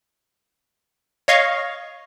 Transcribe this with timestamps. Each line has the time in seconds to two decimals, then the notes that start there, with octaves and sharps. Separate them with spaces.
1.28 C#5 D#5 F5 C#6